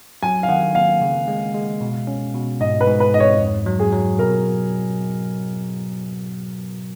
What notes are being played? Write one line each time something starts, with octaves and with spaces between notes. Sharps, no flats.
F#3 G#5
F5
D#3 F#5
A#3 F5
C#3
G#3
G#3
B2
C#4
B2
G#2 D#5
B4
G#2
B4
G#2 D#5
C#5
F2
F#3
G#4
F#3
B2 A#4